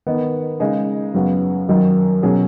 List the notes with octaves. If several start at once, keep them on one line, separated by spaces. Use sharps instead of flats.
D#3 B3 D#4
C#3 G#3 D#4 G#4
F#2 C#3 B3 F#4
F#2 D#3 F#3 D#4
B2 F#3 C#4 G#4